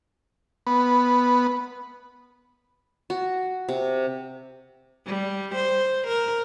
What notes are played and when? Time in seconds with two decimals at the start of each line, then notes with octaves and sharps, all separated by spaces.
0.67 B3
3.10 F#4
3.68 C3
5.06 G3
5.55 C5
6.07 A#4